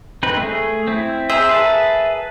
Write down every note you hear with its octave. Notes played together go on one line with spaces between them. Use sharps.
C4 D#4 B4
A3 G#4
C4 E4
G#4 A#4 C5 E5
G#4 B4 A5